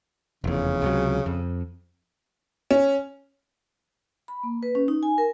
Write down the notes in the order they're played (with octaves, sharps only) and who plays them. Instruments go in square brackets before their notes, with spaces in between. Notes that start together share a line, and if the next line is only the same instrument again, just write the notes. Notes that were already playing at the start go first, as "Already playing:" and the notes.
[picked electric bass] F1 E2 [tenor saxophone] C#3
[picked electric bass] C#2 C3 F#3
F2
[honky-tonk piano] C#4
[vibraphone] B5
A#3
B4
C#4
D#4
G#5
A#4